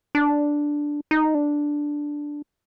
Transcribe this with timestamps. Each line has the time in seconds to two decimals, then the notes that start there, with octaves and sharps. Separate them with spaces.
0.15 D4
1.11 D#4
1.35 D4